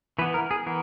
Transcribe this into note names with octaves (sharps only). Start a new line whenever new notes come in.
E3 B3 B4
A#4
G#4
E3 B3 A#4